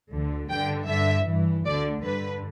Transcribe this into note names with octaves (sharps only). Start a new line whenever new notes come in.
D2 D3
G2 D3 G5
G2 D3 E5
G2 E3
D2 D3 D5
G2 D3 B4